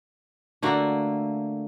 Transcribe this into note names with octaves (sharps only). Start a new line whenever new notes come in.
D3 A3 A#3 F#4